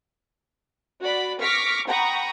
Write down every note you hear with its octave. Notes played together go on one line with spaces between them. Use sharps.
F#4 D5 B5
C#6 D6 F6 A#6 B6 C#7
F#5 G5 A#5 B5 C#6 D#6